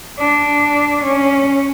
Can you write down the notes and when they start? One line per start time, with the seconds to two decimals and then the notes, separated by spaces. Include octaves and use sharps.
0.19 D4
1.05 C#4